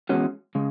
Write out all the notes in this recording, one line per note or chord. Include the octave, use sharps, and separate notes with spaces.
E2 C#3 G#3 C#4 F#4
C#3 G#3